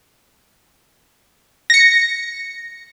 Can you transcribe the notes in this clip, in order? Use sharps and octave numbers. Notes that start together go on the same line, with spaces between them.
A#6 C#7